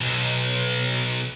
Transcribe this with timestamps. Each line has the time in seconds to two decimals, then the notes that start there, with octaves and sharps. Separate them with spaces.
0.01 B1